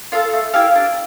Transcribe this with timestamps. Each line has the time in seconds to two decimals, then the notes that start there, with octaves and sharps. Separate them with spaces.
0.12 F4 A4 F5
0.33 A3
0.54 E4 G4 F5
0.75 D4